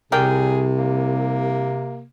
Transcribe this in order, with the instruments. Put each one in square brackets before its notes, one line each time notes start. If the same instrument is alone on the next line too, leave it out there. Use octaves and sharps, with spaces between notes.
[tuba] C2 [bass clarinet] C3 [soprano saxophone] G#4 [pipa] A#4 D5 G5
[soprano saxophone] A#3